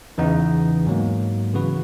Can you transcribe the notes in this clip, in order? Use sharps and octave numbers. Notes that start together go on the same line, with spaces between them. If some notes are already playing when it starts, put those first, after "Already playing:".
E2 C#3 E3 B3 D#4
G#2 F#3 A#3
C#3 E3 B3 F#4 B4